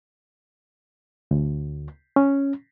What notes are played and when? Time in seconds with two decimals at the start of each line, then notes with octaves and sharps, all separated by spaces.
1.31 D2
2.16 C#4